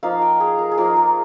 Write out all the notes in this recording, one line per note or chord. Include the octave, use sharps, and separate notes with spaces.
F3 A#3 D#4 F5
G5
G#4
A#4
G#4
F3 A#3 D#4 A#4
A#4